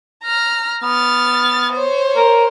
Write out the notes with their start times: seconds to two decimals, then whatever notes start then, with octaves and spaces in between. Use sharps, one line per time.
0.24 A#5 F6
0.83 B3 F6 A6
1.72 C5 C#5
2.16 A#4